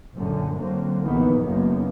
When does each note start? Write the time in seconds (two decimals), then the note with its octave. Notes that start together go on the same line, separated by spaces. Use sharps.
0.14 F#1 F#2 A#2 D3
0.54 D3 F#3 A#3 C4
1.02 A#1 D#3 E3 F#3 A#3 B3
1.41 F#1 F#2 D#3 A#3 B3